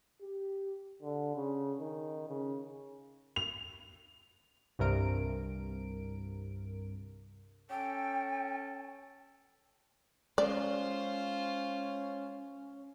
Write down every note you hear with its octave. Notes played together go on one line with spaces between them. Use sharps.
G4
D3
C#3
D#3
C#3
F7
C2 G2 C3 A#4 D7
C#4 A4 G5
G#3 C#4 F4 C5 D5